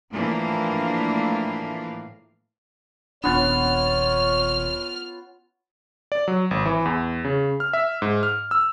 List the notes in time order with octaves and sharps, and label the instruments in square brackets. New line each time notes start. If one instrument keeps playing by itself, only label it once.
[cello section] A2 E3 F3 A#3 D4 F5
[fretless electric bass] D#1 D4 [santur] B3 C#4 F4 [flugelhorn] C#5 [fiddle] F6
[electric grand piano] D5
F#3
G#1
E3
E2
C#3
F6
E5
G#2
F6
E6